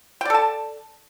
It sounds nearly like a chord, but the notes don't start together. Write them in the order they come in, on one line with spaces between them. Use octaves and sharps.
G5 D5 A4 A5